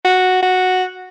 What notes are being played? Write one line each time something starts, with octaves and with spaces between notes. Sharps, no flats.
F#4
F#4